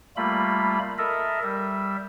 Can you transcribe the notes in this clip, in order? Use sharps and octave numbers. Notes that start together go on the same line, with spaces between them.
G3 A3 A#3 F4 B5
A4 A#4 D#5 E5
G3 E5